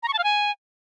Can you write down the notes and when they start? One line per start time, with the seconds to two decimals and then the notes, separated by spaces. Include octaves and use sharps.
0.03 A#5
0.08 C#6
0.13 A5
0.18 F5
0.24 G#5